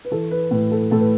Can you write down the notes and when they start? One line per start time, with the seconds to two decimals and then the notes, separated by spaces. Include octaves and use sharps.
0.05 B4
0.11 E3 A4
0.31 B4
0.51 A2 B4
0.72 A4
0.91 A2 A4
1.00 B4